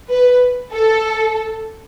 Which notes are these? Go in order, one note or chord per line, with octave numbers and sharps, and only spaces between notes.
B4
A4